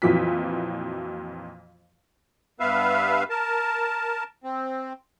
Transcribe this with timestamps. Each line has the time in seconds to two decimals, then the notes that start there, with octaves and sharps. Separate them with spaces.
0.02 F2 A#2 E3 F#3 B6
2.60 G2 B3 B4 E5 F5
3.30 A#4 A5
4.44 C4